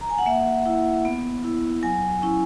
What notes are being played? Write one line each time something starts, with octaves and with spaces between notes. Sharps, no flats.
A#5
G#5
F#5
A#3 E5
E4
B3
E4
F#3 G#5
C#4 E4